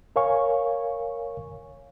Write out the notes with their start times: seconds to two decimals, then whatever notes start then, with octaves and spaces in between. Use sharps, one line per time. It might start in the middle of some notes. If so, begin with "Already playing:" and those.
0.16 A#4 C#5 F5 G#5 C#6